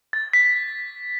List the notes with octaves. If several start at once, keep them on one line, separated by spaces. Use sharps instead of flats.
A6
B6